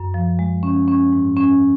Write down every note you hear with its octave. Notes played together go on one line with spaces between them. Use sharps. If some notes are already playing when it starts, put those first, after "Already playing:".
Already playing: F#2
F3
G#3
C#4
C#4
G#2
C#4